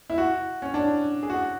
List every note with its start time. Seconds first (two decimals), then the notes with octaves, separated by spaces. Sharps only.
0.10 E4
0.18 F#4
0.62 C#4
0.74 D4
1.23 G#4
1.30 F#4